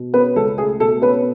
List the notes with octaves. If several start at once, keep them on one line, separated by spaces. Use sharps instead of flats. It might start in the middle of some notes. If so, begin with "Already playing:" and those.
Already playing: B2
B3 C#4 B4
C#2 A4
A3 G#4
B2 A4
B3 C#4 B4